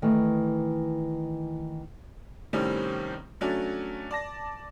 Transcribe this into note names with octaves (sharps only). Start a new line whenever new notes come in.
D#3 E3 A3
A2 C3 D#3 G3 C4 C#4
F#3 A3 C#4 D4 F#4
D5 A5 A#6